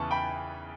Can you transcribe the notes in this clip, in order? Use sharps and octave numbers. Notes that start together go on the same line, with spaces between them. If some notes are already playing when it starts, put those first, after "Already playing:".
Already playing: E2 C#3 E3 A5 C#6
G5 B5